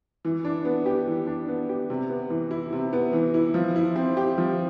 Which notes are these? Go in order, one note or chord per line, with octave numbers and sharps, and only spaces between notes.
E3
D4
B3
G4
E3
D4
B3
G4
C3
B3
E3
E4
C3
B3
E3
E4
F3
E4
C4
G4
F3